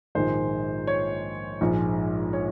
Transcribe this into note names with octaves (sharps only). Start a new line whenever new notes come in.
A#1 G#2 D#3 G#3 C5
C#5
A#1 G#2 F3 G#3
C#5